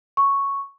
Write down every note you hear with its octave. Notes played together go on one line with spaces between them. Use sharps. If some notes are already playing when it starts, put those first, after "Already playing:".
C#6